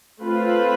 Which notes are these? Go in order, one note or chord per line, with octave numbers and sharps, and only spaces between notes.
A3 C4 F4 B4